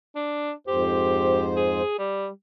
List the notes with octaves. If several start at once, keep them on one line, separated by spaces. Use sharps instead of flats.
D4
F2 G#2 G4 C5
G#4
G3